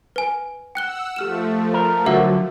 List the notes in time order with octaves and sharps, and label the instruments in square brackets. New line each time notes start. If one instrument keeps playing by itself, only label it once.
[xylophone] B4 G#5
[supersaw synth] F#5 E6 [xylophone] G5 F#6 G7
[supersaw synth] F3 A3 [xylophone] G4 F6 E7
[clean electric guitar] A#4
[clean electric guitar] D3 [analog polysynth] F#3 [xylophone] A#4 E5 F#5